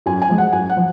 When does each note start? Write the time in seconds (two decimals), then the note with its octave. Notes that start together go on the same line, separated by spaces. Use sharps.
0.06 F#2 G#5
0.22 G#5
0.29 F3 G#3
0.38 F#5
0.53 F#2 G#5
0.69 F#5
0.77 F3